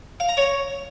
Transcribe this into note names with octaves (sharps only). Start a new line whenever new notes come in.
F5
A#5
C#5